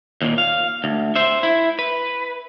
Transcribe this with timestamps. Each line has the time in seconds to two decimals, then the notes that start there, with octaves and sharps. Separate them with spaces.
0.22 D#2 A#2
0.38 F5
0.84 D2
1.15 C5 E5
1.43 E4
1.79 B4